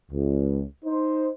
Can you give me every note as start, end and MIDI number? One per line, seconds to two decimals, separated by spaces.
0.11 0.63 37
0.85 1.30 63
0.85 1.30 72